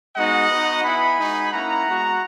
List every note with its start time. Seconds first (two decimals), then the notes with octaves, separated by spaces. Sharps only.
0.15 G#3 B3 D#4 F#4 D#5 F#5
0.50 B3 D#4 F#4
0.83 B3 E4 G#5 B5
1.18 G#3 D#4 F#4
1.51 A#3 C#4 E4 F#5 A#5
1.86 G#3 B3 F#4